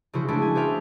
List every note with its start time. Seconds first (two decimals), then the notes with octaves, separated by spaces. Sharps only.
0.13 C#3 F3 E4 F#4 C5
0.28 G#3 A3 C#4 D4 E4 F#4
0.42 G#5
0.55 F#4 G#4 C5 D5 E5 F5